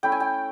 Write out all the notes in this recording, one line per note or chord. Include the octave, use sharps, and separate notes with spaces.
A3 C#4 E4 G5
G#5
G5